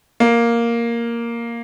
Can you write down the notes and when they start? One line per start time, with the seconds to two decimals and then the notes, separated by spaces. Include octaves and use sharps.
0.20 A#3